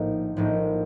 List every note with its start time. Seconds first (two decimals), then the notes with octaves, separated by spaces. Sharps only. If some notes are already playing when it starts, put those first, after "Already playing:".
Already playing: A#1 A2 F3 A#3 D#4
0.37 A#1 A2 F3 A#3 D#4